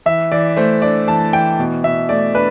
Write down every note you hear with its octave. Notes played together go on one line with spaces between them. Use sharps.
E3 E5
E3 D5
A3 C5
D4 D5
E3 A5
E3 G5
B2
B2 E5
A3 D5
D4 B4